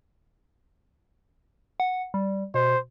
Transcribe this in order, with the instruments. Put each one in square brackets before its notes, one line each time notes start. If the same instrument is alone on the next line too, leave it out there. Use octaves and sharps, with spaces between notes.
[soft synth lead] F#5
G3
[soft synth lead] B2 [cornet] C5